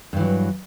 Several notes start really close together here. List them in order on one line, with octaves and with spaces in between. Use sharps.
G2 E3 F#3